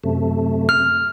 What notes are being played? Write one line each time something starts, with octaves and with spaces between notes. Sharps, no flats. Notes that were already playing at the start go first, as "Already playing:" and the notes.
F#2 C3 A3
F6